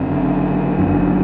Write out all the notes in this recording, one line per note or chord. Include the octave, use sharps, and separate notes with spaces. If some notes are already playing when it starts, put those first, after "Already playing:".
Already playing: F#1 F#2 D3 C4
F#1 F#2 D3